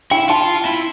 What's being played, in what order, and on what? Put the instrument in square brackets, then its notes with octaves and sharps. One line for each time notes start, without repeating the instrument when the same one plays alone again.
[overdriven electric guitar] E4 [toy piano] G5
[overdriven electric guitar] F4 [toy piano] A5
[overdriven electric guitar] E4